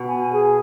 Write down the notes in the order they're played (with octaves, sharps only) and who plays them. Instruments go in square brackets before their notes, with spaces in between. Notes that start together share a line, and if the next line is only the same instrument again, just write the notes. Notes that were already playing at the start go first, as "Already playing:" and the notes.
Already playing: [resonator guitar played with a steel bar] B2
[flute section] G#5
G#4